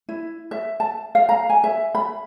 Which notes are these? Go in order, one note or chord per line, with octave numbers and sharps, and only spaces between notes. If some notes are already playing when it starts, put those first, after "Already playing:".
E4
E5
A5
F5
A#5
G#5
E5
B5